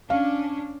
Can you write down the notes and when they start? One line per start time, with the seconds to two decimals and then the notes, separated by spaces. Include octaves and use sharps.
0.10 C#4 D4 F5